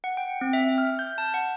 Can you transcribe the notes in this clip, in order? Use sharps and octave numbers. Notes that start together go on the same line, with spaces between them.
F#5
G5
C4
E5
F6
G6
A5
F#5